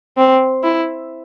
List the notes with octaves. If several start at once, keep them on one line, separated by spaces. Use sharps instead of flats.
C4
E4